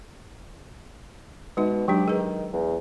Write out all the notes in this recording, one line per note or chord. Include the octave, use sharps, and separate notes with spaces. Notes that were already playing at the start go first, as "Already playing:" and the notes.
B2 G#3 D#4
F#3 G#3 D4 G4
D#3 G#4 B4
E2